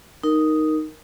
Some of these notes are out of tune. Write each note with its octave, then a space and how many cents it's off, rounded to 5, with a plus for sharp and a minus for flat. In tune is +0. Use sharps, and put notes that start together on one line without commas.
D#4 +0 A#4 +0